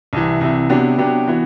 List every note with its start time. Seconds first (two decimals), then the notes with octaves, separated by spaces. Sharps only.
0.13 C2 C3 E3
0.41 C2 C3 E3
0.69 C3 F#3 B3 D4 G4
0.98 C3 F#3 B3 D4 G4
1.27 E3 B3 F#4